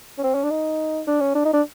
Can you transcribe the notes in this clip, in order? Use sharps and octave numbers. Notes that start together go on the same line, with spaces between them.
C#4
C4
C#4
D4
D#4
D4
C#4
D4
D#4
D4